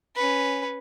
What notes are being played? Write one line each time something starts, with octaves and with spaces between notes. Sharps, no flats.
C#4 B4